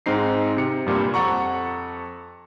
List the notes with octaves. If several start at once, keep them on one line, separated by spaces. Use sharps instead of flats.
G#2 G#3 C4 D#4 C7
C3 C#7
G2 A#2 G3 A#3
F2 A4 F#5 A#5 C#6